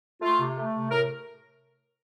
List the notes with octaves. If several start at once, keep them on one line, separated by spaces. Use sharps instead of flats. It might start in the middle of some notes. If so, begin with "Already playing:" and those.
A3 F4
C3
A3
C3
A2 A#4